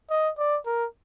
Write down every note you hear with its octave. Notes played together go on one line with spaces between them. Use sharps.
D#5
D5
A#4